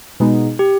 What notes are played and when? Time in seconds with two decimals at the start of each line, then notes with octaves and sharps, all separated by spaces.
0.20 B2 G#3 B3 D#4
0.59 G4